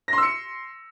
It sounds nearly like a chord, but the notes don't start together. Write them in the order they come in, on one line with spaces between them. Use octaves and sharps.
A#6 C6 E6 C#7